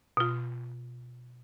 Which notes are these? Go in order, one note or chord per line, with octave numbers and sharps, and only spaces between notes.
B2 F4